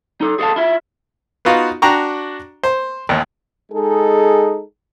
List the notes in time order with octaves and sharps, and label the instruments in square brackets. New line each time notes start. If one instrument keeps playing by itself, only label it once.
[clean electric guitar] D#4 A4
G#4 A4 C#5 F5 A5
E4 F4 E5
[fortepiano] B3 D#4 F4 F#4
D4 F#4 G5 A#5 C#6
C5
A1 D#2
[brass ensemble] G#3 D#4 G#4 A4